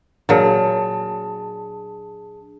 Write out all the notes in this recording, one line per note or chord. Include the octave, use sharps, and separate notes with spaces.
A#2 F#3 D4 G#4 A5